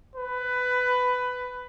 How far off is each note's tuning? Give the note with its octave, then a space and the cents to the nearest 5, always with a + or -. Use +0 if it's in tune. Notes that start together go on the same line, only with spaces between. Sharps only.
B4 +15